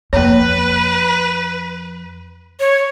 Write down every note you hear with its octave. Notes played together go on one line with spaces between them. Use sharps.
F2 A#3 B4 C#5
C#5